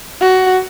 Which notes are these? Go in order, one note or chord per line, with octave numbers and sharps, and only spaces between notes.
F#4